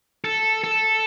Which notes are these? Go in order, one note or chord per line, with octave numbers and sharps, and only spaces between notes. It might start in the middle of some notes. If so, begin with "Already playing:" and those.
A4
A4